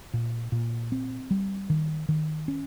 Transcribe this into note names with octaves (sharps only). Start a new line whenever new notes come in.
A#2
A#2
C4
G3
D#3
D#3
C#4